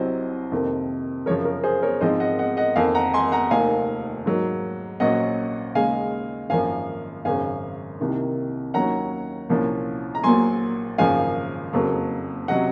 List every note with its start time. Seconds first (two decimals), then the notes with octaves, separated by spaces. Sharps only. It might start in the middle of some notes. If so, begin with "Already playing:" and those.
Already playing: C2 C3 F#3 C4 C5 D#5
0.52 F2 C3 D#3 A#3
1.26 F#2 C#3 F3 A#4 C#5
1.45 A#4
1.63 G#4 C5
1.82 A#4 C#5
2.01 G#2 F3 G#3 C4 C5 D#5
2.20 D#5 F#5
2.39 D#5 F#5
2.57 D#5 F#5
2.76 F2 D#3 A#3 F5 G#5
2.95 F#5 A#5
3.14 G#5 C6
3.32 F#5 A#5
3.51 F1 D#2 D#3 A#3 F5 G#5
4.25 G#2 F#3 A#3
5.00 A#1 A#2 F#3 C#4 D#5 F#5
5.75 D#2 C#3 G#3 F5 G#5
6.50 G#1 F#2 F3 A#3 F5 G#5
7.25 G#1 F#2 C#3 F5 G#5
8.00 C2 C3 D#3 A#3
8.74 D#2 D#3 F#3 C#4 F#5 A#5
9.50 C2 A#2 F3 A#3 C#4
10.15 A#5
10.23 A#1 A#2 F#3 G#5 C6
10.98 G#1 F#2 C#3 F3 A#3 F5 G#5
11.73 F#1 F2 C#3 F#3 A#3
12.48 C3 F#3 C#4 D#5 F#5